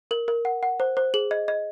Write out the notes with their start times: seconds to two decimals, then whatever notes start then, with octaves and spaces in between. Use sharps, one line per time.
0.11 A#4 F#7
0.28 A#4
0.45 F#5
0.63 F#5
0.80 C5
0.97 C5
1.14 G#4 F#7
1.31 D#5
1.48 D#5